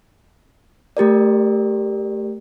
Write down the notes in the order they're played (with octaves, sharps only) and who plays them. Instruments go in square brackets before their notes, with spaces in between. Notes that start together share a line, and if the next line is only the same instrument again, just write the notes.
[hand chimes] A3 G4 A#4 D5